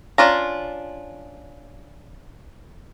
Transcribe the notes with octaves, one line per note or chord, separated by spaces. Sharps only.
C#4 D4 F4 A#5